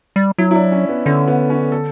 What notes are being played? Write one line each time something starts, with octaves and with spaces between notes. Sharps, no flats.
G3
F#3 E4
E4
D4
C#4
B3
D3 C#4
B3
C#4
A4